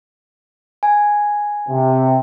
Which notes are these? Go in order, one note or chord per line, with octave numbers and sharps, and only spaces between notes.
G#5
C3